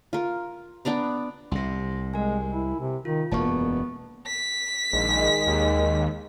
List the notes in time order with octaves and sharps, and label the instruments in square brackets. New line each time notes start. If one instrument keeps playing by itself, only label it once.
[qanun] F4 A#4
B3 D4 D5 A#5
[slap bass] C2 C3 [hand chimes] C6 A#6
[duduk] G#3 [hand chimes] A#4 G#5
[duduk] E4
C3
[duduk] D#3 [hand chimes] F4
[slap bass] E1 F#2 A#3 [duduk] B3 [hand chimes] A5 C#6
[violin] B6
[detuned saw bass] A#1 [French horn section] D#3 G#3
[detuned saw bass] D#2